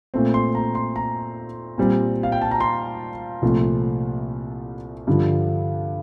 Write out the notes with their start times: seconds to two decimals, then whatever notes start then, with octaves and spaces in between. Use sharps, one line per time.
0.14 A#2 A3 C4
0.34 C6
0.55 A#5
0.75 C6
0.96 A#5
1.78 A#2 G3 C4
2.23 F5
2.32 G5
2.42 A5
2.51 A#5
2.60 C6
3.42 C2 A#2 F3 A3
5.07 G2 D3 F3